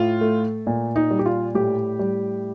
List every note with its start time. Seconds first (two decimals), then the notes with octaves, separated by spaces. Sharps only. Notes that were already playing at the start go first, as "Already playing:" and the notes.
Already playing: A2 F4
0.21 A3
0.67 A#2
0.96 D#4
1.11 G3
1.19 G4
1.26 F4
1.55 A2 G4
1.99 G3